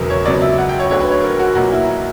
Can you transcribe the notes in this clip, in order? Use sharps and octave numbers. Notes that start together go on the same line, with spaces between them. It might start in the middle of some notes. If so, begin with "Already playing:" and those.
Already playing: E1 E2 C#3 F#3 A#4 B4
C#5
C#2 B2 F#3 D5
E5
F#5
G5
C#5
D2 D3 F#3 C#5
B4
C#5
A#4
F#4
B1 A#2 F#3 F#4
E4